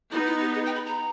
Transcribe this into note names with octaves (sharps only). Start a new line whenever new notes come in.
B3 D#4 E4
E4
G4
G#4
G5
B5
A#5